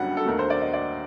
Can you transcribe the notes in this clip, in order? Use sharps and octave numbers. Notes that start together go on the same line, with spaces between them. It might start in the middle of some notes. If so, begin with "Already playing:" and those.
Already playing: F#1 F#2 D3 G3 F#5
A4
D#2 D3 A3 A#4
C5
D5
D#5
D5